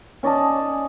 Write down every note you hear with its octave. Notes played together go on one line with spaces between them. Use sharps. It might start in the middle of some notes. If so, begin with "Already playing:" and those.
C#4 D5 D#5 A5